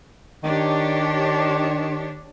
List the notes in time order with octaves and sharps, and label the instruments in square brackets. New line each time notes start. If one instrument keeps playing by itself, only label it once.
[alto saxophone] D#3 [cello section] D4 G4 C#5